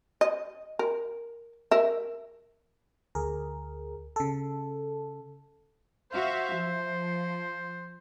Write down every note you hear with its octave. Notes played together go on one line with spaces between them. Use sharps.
D#5
A#4
A#4 E5
D2 G#4 A#4
C#3 A4
F#4 C5 E5 F5
F3